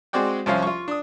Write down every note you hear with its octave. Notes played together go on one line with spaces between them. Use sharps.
G#3 C4 F#4 D5 G5
C2 F3 C#4 C5 F5
F4 C#6
D4 D#6